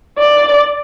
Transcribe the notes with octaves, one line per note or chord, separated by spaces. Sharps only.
D5